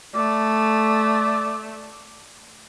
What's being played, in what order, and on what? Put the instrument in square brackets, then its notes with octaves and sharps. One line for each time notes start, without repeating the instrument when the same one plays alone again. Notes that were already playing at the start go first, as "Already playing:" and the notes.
[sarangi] A3 [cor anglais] D5